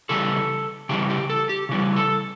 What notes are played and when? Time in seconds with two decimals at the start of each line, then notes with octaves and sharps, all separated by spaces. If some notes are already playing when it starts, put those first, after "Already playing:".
0.09 C#3 E3 G3 A4
0.89 C#3 E3 G3 G4
1.10 G4
1.30 A4
1.49 G4
1.69 C#3 E3 G3
1.96 A4